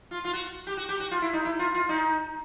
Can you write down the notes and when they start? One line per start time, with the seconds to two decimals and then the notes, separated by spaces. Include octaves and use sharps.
0.11 F4
0.25 F4
0.33 F#4
0.67 G4
0.77 F#4
0.89 G4
1.00 F#4
1.11 F4
1.22 E4
1.33 D#4
1.45 E4
1.59 F4
1.75 F4
1.89 D#4